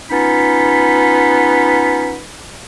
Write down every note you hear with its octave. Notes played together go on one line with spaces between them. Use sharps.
B3 C#4 D#4 F4 B5